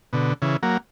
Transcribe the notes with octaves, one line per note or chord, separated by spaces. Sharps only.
B2 D3
C#3 E3
F#3 A#3